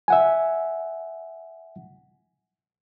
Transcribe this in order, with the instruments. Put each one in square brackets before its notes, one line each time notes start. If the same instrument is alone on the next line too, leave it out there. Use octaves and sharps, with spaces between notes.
[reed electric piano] E5 F#5 G#5